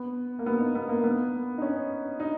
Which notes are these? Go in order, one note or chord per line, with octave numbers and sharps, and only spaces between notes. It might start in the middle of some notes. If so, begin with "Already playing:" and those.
Already playing: B3
A#3
B3
D#4
B3
A#3
B3
D#4
C#4
D#4